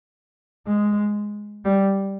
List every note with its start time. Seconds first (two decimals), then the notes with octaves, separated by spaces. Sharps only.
0.67 G#3
1.65 G3